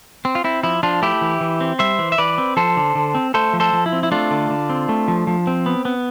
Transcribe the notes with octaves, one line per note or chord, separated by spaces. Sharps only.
C4
F4
C4 E4
F3 E4
F3 D4 F4
A3 E4 G4
E3
E3
C4
G3 C5 E5
E3
E5
E3 B4 D5
C4
F3 A4 C5
D3
D3
C4
A3 A4 C5
F3
A4 C5
F3
E4
C4
E4
A3 D4 F4
D3
D3
C4
A3
F3
F3
C4
B3
B3